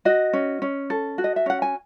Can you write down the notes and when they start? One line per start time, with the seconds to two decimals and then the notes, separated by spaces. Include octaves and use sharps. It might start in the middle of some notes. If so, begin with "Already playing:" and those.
0.05 F#4 D#5
0.33 C#4
0.62 C#4
0.90 A4
1.18 F#4
1.24 D#5
1.36 E5
1.46 C#4 F#5
1.62 G#5